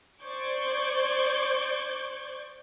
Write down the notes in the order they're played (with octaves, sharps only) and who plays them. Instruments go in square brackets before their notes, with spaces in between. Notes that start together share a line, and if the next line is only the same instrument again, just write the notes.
[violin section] C5 D5 C#6 D6 G6 G#6